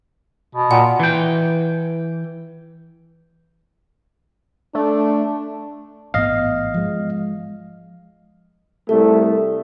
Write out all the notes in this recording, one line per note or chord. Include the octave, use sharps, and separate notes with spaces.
B2
A#2 F#5
E3 G5
A3 D4
A1 G#2 B3 D#5 F5
F3 G#3
C2 A3 A4